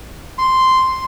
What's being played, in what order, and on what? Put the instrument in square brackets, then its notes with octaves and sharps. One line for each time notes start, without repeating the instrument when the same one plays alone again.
[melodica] C6